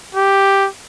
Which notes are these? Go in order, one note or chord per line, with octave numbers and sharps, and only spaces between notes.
G4